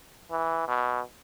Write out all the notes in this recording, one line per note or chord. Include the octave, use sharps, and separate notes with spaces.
E3
B2